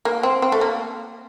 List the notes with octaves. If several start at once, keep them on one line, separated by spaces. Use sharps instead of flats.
A#3
C4
C4
A3
A#3